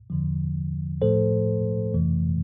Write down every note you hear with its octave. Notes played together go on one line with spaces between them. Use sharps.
E2 D3 F3
A2 F3 A3 A4 C5
F2 C3 E3 A3